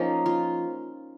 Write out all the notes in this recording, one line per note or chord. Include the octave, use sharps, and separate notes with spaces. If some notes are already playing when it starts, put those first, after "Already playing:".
Already playing: F3 A#3 C#4 D#4
F4